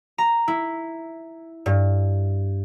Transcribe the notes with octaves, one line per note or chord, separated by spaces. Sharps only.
A#5
E4
G2